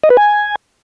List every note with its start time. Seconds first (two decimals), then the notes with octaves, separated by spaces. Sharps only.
0.04 D#5
0.10 B4
0.17 G#5